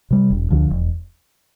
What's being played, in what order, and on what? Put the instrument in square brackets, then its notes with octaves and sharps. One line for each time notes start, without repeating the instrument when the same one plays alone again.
[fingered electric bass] C3 G3
E1
D2 D3 F3
E1